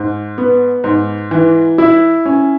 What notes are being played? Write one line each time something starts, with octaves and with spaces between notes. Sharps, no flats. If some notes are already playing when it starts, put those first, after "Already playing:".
Already playing: G#2
B3
G#2
E3
E4
C#4